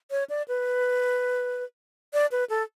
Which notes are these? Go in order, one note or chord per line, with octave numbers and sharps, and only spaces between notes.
C#5
D5
B4
D5
B4
A4